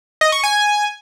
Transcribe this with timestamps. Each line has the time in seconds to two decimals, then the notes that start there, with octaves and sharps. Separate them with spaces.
0.21 D#5
0.32 C#6
0.43 G#5